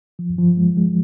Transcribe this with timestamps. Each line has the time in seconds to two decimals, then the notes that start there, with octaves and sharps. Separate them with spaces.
0.19 F3
0.39 F3
0.57 G#3
0.77 G#3